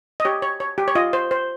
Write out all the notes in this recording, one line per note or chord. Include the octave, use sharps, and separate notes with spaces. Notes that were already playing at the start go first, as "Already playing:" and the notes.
D#5
G4 C#5
C#5
C#5
G4
C#5
F4 D#5
C5
C5